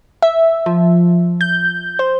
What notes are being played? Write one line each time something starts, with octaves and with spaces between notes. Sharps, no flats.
E5
F3
G6
C5